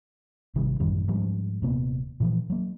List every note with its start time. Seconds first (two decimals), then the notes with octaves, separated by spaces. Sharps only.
0.55 G#1 C3 D#3 G3
0.80 A1 F#2 D#3 G3
1.08 G#2 F3 G3 G#3
1.62 D#1 C3 A#3 B3
2.20 A#2 E3 F3
2.50 F#3 A#3